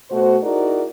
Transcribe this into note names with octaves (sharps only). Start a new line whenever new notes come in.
B2 A3 F#4 C5
D#4 E4 F#4 G#4 A#4 D5